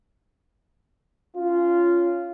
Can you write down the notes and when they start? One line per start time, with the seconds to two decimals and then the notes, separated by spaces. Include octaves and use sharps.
1.36 C#4 F4